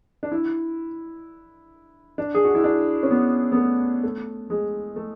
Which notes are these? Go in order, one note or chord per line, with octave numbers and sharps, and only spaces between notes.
D4
E4
D4
G#4
F#4
E4
D4
C#4
B3
B3
A3
A3
G#3
A3